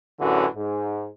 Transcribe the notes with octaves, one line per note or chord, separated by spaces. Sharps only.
A1 F#2 D3 E3 F#4
G#2